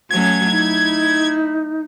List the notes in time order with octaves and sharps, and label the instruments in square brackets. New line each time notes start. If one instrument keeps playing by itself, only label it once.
[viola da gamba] F#3 A3 C#4 [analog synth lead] G#6
[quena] D#4 [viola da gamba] E4